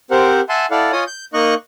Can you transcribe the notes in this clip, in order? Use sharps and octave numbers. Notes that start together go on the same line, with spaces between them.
C4 G4 A#4 C5 F#5
E5 F#5 G#5 A5 C6
E4 A4 D5 F5 F#5
F4 C#5 D#5 G#5 D#6
G6
A#3 D#4 D#5 C#6 F#6